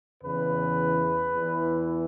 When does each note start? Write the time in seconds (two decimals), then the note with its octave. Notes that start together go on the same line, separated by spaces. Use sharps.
0.24 E2 C#3 E3 B4
1.34 E2 E3